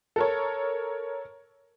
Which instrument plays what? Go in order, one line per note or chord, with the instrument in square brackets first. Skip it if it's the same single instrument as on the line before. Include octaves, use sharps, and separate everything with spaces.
[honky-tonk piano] A4 A#4 C#5